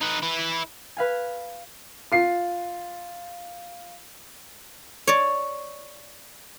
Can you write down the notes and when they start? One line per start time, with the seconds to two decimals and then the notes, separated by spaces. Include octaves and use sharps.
0.01 D#4 B4
0.23 E4 B4
0.97 B4 F5 G#5
2.12 F4 C7
5.07 C#5 D5